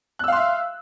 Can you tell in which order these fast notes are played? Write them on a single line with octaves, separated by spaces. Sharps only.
F#6 E6 F5 C6 E5